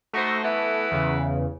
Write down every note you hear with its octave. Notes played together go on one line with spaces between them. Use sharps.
A3 D#4 F#4 C5
E3 B3 E4
E2 C#3